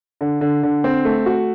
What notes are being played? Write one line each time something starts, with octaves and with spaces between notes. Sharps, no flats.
D3
D3
D3
C4
A3
F#4